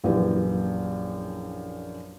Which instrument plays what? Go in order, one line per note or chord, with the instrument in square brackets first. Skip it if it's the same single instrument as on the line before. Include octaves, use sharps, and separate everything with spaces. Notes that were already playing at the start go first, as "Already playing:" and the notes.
[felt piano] A#1 F#2 E3 G4 B4